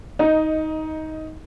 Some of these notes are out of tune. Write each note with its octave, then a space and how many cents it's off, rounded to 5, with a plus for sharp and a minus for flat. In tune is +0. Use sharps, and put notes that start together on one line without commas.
D#4 +15 D#5 +0